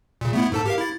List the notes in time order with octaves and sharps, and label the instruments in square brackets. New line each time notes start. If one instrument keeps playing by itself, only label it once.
[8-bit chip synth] A#2 C#3
A3 B3 E4
G#2 A4 A5
G4 A#4 F5
E4 A6